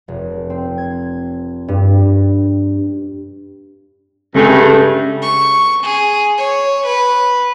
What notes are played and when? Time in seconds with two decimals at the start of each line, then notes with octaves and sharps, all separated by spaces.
0.08 F1
0.50 C4
0.78 G#6
1.68 G2
4.35 G2 C#3 G#3 A3
5.22 C#6
5.83 G#4
6.37 C#5
6.86 B4